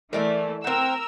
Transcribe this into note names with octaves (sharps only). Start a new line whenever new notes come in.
E3 A3 A#4 D5 E5
C4 A#4 F#5 E6